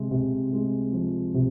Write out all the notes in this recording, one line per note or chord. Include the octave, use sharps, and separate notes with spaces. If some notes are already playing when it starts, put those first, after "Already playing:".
Already playing: C3 G#3
C3
G#3
F3
C3